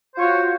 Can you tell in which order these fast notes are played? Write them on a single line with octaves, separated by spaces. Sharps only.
C5 F4 C#5 F#4